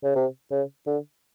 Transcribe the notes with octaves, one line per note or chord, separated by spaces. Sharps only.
C#3
C3
C#3
D3